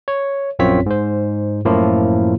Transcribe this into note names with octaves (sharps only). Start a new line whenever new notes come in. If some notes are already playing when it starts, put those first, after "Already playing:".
C#5
A#1 F#2 C4 F4 C#5 B6
G#2 C5
F#2 A2 F3 A#3 E4 F4